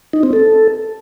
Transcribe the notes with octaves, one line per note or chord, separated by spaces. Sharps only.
D#4
C4
A4